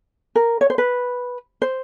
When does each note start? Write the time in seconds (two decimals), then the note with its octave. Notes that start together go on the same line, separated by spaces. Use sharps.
0.35 A#4
0.61 C#5
0.70 C5
0.78 B4
1.62 C5